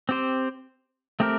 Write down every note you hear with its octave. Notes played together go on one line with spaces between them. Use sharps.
C4 G4 C5
A3 C4 G4 A#4